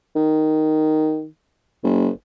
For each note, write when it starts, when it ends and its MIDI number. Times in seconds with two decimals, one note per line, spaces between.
0.16 1.26 51
1.84 2.08 30